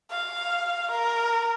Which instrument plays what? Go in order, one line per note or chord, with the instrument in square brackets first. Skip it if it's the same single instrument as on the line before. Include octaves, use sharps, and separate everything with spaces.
[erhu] F5
A#4